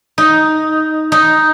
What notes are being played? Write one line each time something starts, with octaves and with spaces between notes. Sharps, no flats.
D#4
D#4